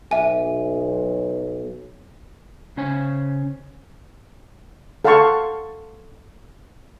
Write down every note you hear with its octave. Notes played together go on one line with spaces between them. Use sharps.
B1 E5 G#5
C#3 C#4 C5 C#5 G#5
A4 F5 F#5 A5 C6 C#6